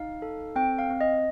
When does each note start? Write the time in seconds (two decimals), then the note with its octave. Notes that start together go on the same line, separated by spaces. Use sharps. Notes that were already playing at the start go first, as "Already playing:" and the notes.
Already playing: D#4 F5
0.22 A4
0.56 C4 G5
0.79 F5
0.90 C4
1.01 D#5